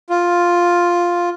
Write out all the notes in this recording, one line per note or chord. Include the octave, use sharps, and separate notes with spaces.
F4